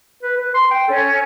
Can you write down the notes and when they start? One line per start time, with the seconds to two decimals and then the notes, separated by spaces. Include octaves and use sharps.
0.23 B4
0.37 B4
0.54 C6
0.71 G5
0.88 C#4 A4